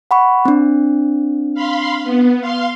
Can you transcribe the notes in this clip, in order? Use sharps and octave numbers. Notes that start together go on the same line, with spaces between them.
F#5 B5 C#6
C4 D4
F5 B5 C6
B3
F5 C6